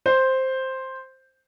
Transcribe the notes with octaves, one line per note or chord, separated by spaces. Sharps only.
C5